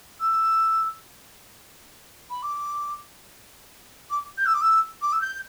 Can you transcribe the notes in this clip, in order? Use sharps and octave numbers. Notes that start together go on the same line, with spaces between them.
E6
B5
D6
D6
G6
E6
D6
E6
D6
E6
G6